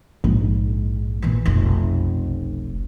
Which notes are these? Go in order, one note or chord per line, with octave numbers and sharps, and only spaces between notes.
A#1 G#2
A#2 E3
F1 B1